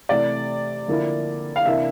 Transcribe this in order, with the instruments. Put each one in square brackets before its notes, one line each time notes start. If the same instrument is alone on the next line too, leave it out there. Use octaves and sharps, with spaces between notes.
[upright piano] C3 E3 A3 D5
D3 F3 A#3 E4
F5
C3 E3 A#3 D4 E5